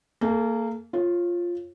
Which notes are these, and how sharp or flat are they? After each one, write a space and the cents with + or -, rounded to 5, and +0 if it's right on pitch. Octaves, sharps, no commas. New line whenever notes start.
A#3 -25 G#4 +45
F4 +0 C#5 -35